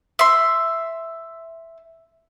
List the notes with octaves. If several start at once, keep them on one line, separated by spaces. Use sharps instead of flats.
E5 C6